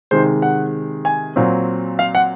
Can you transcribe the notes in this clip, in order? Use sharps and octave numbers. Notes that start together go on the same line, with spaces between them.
C3 D#3 G#3 C5
F#5
G#5
A#2 F#3 C4
F5
F#5